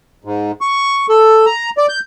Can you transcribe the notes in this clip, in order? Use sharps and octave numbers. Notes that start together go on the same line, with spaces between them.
G#2
C#6
A4
A#5
D5
G6